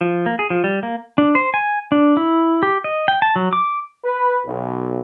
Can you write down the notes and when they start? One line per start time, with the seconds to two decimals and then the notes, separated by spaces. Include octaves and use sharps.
0.01 F3
0.26 A#3
0.39 G#4
0.50 F3
0.64 G3
0.83 A#3
1.18 D4
1.35 C5
1.54 G#5
1.92 D4
2.17 E4
2.63 G4
2.84 D#5
3.08 G5
3.22 A5
3.36 F#3
3.53 D6
4.05 B4
4.45 B1